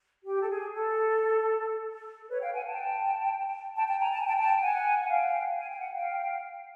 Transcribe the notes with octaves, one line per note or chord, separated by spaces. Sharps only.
G4
A4
G#4
A4
A4
B4 C#5
F5 G5
F#5 G#5
G5 A5
G5 A5
G5 A5
G#5 A#5
A5
G#5
G5 A5
G5 A5
F#5 G#5
F#5
F5 G5
G#5
G5
F#5
F5 G5